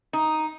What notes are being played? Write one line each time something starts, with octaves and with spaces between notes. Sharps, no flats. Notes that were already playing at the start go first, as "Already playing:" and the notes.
D#4